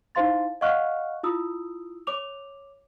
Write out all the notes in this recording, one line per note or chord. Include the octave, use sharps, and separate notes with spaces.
D#4 E4 C5 F5 C6 A6
D#5 F5 F#5 C#6 F6 F#6
E4 F4 D#6 E6
C#5 D6 F7